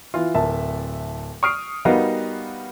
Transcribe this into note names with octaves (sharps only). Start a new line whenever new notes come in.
E3 F4
D1 A#4 E5 A5
C#6 D#6 F6 C7 D7
G3 B3 D#4 F#4 A#4 F5